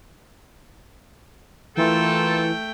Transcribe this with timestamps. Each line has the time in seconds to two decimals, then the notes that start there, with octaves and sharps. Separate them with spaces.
1.77 E3 A3 A#3 F4 A4 G5